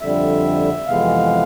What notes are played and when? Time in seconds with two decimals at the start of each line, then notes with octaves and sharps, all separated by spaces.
0.01 F2 D3 G3 E5
0.87 F2 C3 E3 G#3 B3 F5